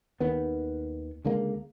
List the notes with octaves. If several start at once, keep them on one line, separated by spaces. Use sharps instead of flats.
D#2 D#3 B3
C#2 D3 G#3 A#3